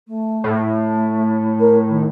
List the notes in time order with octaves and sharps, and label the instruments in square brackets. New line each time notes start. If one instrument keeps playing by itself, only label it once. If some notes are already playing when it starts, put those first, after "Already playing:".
[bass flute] A3
[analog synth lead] A2
[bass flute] A#4
D#3